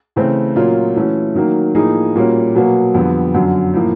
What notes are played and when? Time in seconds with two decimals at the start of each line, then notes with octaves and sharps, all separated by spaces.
0.16 C#3 E3 A3 C4
0.56 A#2 F#3 A#3 C#4 F4
0.96 E3 A3 C#4 F#4
1.35 D#3 F#3 A#3
1.75 A2 F3 A#3 D#4 G#4
2.15 A#2 G3 A#3 C#4 F#4
2.55 B2 F#3 A#3
2.95 F2 D3 G3 B3
3.34 F#2 D3 F#3
3.74 A2 F3 A#3